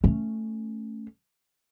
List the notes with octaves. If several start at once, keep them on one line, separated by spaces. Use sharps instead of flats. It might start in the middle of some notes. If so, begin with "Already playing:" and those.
A3 C#4